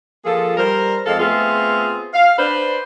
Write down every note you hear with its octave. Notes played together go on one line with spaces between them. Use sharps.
F3 A#3 F4 G#4 A4
G3 A#4 C5
F2 G#3 C4 A4 D#5 F5
A3 B3 C4 F4 G#4
F5
D4 B4 C5